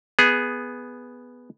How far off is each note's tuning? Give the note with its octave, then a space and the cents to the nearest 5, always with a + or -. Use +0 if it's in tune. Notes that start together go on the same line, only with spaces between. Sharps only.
B3 +0 G#4 +0